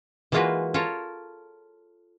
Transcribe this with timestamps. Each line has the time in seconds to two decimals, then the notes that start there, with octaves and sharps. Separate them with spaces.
0.32 E3 G#3 A#3 F4 F#4 B4
0.74 F4 A4 A#4 C#5